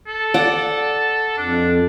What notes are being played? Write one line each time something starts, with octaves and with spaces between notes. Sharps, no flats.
A4
D5 F#5
F2 D4